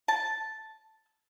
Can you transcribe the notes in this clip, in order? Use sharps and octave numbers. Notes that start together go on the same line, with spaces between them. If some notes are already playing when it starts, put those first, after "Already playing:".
A5